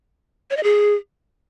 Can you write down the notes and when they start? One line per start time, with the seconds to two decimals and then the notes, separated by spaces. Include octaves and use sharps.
0.50 C#5
0.57 D#5
0.63 G#4